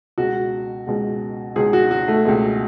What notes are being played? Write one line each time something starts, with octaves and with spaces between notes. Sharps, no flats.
C#2 B2 G#3 F#4
C#2 B2 G#3
C#2 B2 G#3 G#4
F#4
F#4
A3
C#2 B2 G#3